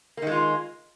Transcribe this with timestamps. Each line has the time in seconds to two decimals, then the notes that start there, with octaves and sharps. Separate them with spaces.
0.17 A#3
0.22 D#3
0.27 G#3
0.32 F4